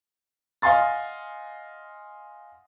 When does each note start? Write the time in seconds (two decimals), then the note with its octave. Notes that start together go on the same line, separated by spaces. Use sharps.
0.62 D#5 F5 F#5 G#5 C6 A6